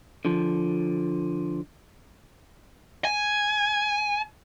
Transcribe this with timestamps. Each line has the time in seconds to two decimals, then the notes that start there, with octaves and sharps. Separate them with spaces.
0.25 D3 F3
3.05 G#5